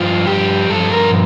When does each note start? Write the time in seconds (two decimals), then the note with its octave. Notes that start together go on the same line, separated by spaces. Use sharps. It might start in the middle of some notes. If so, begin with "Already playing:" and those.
Already playing: G2 F3 F4
0.26 G4
0.69 G2 F3 A4
0.91 A#4